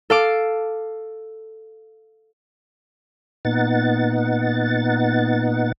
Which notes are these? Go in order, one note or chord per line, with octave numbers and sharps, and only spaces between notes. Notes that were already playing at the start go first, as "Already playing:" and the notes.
A4 F5 D6
A#2 B3 D#4 F#5 A6